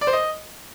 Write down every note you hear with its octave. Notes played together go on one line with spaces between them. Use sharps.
D5
C5
D#5